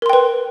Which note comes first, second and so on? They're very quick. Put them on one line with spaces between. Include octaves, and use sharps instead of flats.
A#4 C6 G5 B4